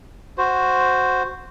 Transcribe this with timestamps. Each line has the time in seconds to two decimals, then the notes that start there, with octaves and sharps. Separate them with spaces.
0.38 F#4 C5